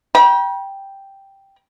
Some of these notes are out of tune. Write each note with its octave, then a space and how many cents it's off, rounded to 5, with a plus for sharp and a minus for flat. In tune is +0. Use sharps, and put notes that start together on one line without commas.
G5 +0 B5 -45